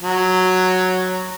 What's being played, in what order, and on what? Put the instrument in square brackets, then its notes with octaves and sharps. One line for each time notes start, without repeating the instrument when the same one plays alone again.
[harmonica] F#3